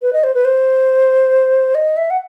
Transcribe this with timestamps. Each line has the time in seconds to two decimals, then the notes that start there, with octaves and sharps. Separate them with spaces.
0.02 B4
0.13 D#5
0.24 C5
0.34 B4
0.45 C5
1.75 D#5
1.97 E5
2.10 F#5